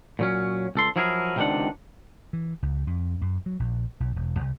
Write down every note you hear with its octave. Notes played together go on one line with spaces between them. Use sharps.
A#2 F#3 C#4
C#2 A4 C6
F3 F#3 E4 G#4 A#4
C#2 C3 D#3 F#3 D4 F#5
E3
C#2
F2
F#2
F#3
A#1
B1
E1
C2